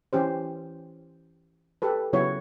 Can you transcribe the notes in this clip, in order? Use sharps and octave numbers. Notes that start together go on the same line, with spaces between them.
E3 C#4 G4 C5
G4 A4 B4
C#3 F#3 B3 E4 F#4 C#5